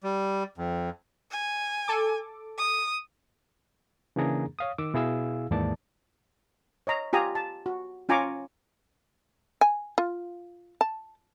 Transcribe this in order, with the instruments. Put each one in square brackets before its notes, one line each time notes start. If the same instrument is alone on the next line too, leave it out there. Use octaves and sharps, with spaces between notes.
[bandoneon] G3
F2
[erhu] G#5
[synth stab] A4 D6
[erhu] D#6
[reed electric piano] C#3 E3 A#3 D4 G#4 A#5
C#5 F5 D#6
D#3 D6 E6
B2 E4 G#4 F5 E6
D#2 G#2 E3 A#3 D5 A5
[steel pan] C#5 D#5 A#5
F4 G4 G#5 A#5 D#6
A5
F#4
C#4 F4 G#5 A#5 C#6 D6
[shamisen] G#5
F4
A5